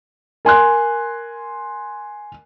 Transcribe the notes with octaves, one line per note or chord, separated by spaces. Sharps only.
A#4 G#5 C6 F#6